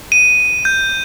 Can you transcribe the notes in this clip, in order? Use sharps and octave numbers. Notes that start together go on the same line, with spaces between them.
D#7
G6